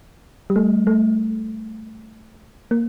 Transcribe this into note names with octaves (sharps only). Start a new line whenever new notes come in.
G3
A3
A3
A#3